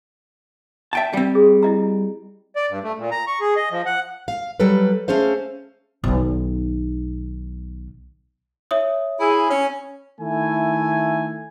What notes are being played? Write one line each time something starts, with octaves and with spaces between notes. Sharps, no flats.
E5 G5 A5
G3 C4 G5
G#4
E4 D#5 A#5
D5
G2
A3
A#2
A#5
C#6
G#4
D#5
F3
F#5
F5
F#3 G3 A4 B4
A3 C#4 G#4 C5 F5
B1 D#3
C#5 E5 D#6
E4 G#4
C#4
D#3 A3 E4 G#5